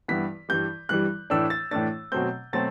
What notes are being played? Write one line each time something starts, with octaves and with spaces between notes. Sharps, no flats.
G2 E3 B3 E4 B6
G2 E3 G3 G6
G2 E3 G3 F#6
A2 E3 A3 D4 E6
A6
A2 E3 A3 D4 A6
B2 F#3 A3 C4 G6
B2 F#3 A3 C4 A6